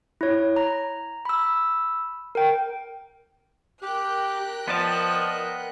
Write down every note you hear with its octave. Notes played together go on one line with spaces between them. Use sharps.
E4 C#5
A#5
B5 E6
A#4 G5
G4 A#4 G5 F#6
F3 B3 D5 D#5 A5